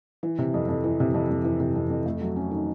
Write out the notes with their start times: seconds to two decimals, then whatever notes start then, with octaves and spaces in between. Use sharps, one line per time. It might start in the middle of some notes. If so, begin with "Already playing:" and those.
0.23 E3
0.38 C3
0.54 F2
0.68 F2
0.84 E3
1.00 C3
1.14 F2
1.30 F2
1.44 E3
1.60 C3
1.75 F2
1.90 F2
2.06 A3
2.21 F#3
2.36 C#4
2.51 D#3